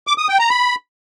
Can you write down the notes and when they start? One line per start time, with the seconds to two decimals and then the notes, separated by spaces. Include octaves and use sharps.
0.07 D6
0.18 D#6
0.29 G5
0.39 A#5
0.50 B5